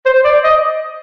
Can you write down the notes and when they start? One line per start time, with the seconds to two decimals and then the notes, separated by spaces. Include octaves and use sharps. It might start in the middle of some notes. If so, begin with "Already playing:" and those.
0.06 C5
0.24 D5
0.43 D#5